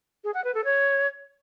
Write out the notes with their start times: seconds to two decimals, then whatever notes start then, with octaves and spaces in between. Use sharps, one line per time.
0.24 G#4
0.34 F#5
0.44 B4
0.55 A4
0.65 C#5